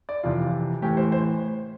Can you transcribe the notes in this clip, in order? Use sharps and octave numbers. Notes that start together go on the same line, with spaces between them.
D5
F2 C3 E3 F4
A2 E3 G4
C5
C5